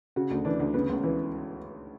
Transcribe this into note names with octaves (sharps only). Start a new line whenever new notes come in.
C#3 F#4
D2
E3 D4
D2
C#3 B3
C#2
E3